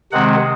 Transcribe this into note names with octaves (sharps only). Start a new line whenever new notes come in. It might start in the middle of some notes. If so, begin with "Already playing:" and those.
C3 D#3 G#3 C4 F#5